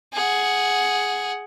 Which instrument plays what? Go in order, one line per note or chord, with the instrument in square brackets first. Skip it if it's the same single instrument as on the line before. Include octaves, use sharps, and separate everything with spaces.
[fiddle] G#4 F#5